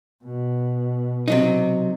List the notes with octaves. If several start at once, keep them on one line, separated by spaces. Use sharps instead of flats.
B2
C3 F#3 D#4